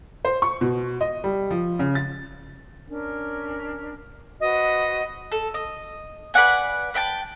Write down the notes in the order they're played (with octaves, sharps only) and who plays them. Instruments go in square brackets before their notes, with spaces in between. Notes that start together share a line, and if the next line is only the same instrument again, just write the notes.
[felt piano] C5
C#6
B2
D#5
G3
F3
C#3
A6
[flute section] C#4 D4 A#4
[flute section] F#4 B4 C5 [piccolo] D#5
[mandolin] A4
D#5
B4 D5 F#5 G#5
B4 E5 G5 A5